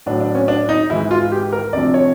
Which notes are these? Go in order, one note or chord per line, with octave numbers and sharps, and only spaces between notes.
A2 F#3 A3 D4
D4
C#4
D4
D#4
G#2 E3 G#3 E4
F4
G4
A#4
D2 C3 F3 D5
C#5